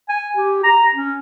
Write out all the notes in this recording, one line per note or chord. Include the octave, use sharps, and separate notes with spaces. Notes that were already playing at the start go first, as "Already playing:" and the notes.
G#5
G4
A#5
C#4